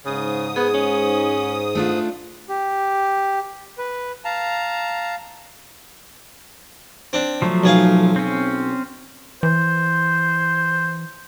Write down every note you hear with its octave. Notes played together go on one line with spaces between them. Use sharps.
G#2 C#3 D#6
B3 G#4
C#4
A3 D4 F4
G4
B4
F5 A5 A#5
C4 D4
F3 F#3 A3
B1 G#4 F5
C4 C#4
E3 C5